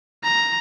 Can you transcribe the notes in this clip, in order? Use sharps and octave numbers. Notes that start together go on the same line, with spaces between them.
A#5